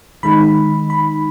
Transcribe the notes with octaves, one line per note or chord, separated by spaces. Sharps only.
D#3 G#3 D#4 B5
B5